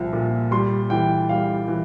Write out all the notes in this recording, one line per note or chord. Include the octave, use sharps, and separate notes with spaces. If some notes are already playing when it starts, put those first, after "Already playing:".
Already playing: C2 A#2 F3
A#2
G3 C6
E3 G5
G3 F5
E3